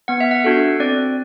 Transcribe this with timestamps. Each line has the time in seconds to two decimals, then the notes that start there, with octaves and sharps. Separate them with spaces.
0.08 B3 F#5
0.20 E5
0.31 F#5
0.44 D4 F#4 A4
0.80 C4 D5